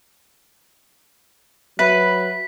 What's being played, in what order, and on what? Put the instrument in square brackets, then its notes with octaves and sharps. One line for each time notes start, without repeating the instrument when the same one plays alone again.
[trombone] F#3 [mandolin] B4 [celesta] E5 B5 [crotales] B6